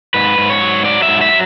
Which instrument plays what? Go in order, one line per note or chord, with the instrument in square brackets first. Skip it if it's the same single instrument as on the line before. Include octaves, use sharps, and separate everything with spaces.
[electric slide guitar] G#2 B4
G#2
C#5
F#3
F#3 D5
E5
G#2
E5